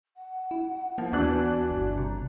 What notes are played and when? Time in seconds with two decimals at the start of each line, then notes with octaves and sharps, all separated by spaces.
0.17 F#5
0.51 E4
0.98 F3 A#3
1.12 D#2 E3 B3 D4 F#4 F#6
1.71 G1
1.97 C3 A#5